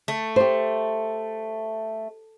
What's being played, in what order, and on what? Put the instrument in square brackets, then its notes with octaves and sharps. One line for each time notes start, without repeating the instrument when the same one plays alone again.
[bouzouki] A3
[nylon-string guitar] G4 C5